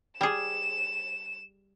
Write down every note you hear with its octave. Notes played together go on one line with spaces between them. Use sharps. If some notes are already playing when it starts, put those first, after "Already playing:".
G3 G#4 E7